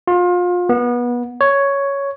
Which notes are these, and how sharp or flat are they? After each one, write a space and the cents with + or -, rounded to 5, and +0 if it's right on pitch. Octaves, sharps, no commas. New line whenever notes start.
F4 +30
B3 -25
C#5 +5